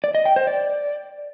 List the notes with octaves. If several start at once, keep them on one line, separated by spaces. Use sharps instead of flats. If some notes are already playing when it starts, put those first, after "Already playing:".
D5
D#5
G5
C5
D5